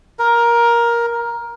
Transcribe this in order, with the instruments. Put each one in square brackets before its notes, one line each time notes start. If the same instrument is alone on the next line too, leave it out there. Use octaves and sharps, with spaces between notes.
[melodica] A#4